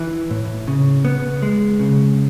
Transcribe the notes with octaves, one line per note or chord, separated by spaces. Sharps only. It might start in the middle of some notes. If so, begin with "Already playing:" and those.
Already playing: E3
A2
C#3
B3
G#3
C#3